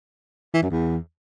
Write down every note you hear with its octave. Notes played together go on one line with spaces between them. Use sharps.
E3
F#2
E2